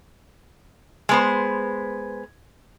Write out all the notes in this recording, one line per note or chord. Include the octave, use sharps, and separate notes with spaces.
G#3 B3 C5